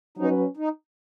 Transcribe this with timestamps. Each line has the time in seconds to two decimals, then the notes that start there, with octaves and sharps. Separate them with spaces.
0.18 F#3 C#4 D#4 B4
0.57 D#4